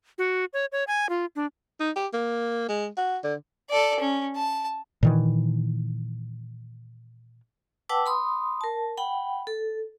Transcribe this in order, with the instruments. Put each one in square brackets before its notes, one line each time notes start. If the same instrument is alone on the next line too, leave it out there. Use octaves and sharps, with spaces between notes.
[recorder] F#4
C#5
C#5
G#5
F4
D4
[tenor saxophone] D#4
G4
A#3
G#3
F#4
D3
[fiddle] A4 D5
C#4
A5
[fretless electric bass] A#2 D#3 E3
[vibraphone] B4 F#5 G5 A5 D6 E6
B5 C6 D#6
A#4 A5
F#5 G5 B5
A4